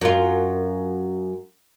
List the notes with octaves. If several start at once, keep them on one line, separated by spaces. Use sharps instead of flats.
F#2 F4